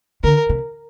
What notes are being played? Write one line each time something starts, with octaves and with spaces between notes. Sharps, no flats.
D3 A#4
C3